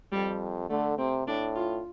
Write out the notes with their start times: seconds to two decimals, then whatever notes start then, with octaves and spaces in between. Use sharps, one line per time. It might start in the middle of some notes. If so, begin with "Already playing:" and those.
0.12 F2 G3
0.69 D3 A3
0.98 C3 C4
1.27 A2 D4
1.56 F4